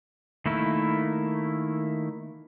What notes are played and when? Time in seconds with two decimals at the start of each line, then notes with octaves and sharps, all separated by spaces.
0.46 D#3 A3 A#3 E4